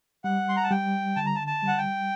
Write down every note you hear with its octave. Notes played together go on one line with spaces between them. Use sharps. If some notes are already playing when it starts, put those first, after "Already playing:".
G3 F#5
C6
A#5
A5
G3 G5
D3 A5
A#5
A5
A5
G3
F#5
G5